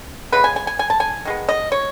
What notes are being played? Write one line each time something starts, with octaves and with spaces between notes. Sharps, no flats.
C#3 G#3 B3 B4
G#5
G#5
G#5
G#5
A5
G#5
D#3 G#3 B3
D#5
C#5